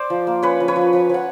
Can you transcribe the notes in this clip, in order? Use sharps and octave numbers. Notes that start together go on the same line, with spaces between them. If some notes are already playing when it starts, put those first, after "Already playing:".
Already playing: C5 D5
F3
A#3
C#4 B4 C#5
F3
B4 C#5
F3
F3
F3 F#5